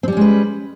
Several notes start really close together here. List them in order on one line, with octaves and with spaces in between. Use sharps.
C4 G3 C#4 G#3 B4